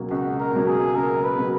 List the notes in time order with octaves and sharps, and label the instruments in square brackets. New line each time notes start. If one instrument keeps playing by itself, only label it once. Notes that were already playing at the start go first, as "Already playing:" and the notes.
Already playing: [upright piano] C#2 B2 F#3 A#3
[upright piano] C#2 [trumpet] F#4
[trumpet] A#4
[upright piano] B2 F#3 A#3
[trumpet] G#4
[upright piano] C#2 [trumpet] A#4
[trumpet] B4
[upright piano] B2 F#3 A#3